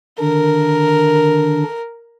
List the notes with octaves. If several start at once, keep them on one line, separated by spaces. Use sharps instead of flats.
D3 D#3 D4 A#4